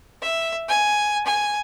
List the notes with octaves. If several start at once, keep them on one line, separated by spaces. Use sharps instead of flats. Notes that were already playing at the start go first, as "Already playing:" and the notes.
E5
G#5
G#5